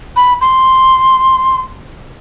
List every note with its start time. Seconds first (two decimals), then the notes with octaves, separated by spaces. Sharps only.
0.17 B5
0.41 C6